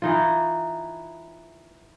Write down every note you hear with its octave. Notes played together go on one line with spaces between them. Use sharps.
E3 D#4 F4